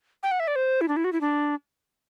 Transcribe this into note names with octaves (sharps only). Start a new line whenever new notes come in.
G5
F#5
E5
D5
C5
E4
D4
E4
F#4
E4
D4